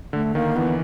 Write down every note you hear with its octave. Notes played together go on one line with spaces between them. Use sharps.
D3 A3
D#3 A#3
E3 B3